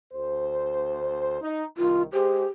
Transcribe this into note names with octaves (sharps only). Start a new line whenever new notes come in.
D2 C5
D#4
C2 D#3 F4
G#3 G4 G#4 C5